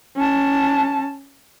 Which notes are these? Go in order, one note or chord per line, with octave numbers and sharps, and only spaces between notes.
C#4 A5